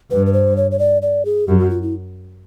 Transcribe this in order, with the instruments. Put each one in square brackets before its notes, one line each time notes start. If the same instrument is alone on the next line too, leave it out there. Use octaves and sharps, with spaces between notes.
[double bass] G2 [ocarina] B4
[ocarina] B4
C5
C#5
C#5
D5
D5
G#4
[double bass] F#2 [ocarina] G4
[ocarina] F#4
F4
E4